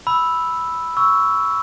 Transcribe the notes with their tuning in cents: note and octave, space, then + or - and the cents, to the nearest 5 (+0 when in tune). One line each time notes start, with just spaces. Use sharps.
B5 +0 E6 +0
C#6 +10 E6 +0